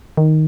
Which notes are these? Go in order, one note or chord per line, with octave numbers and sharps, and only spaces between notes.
D#3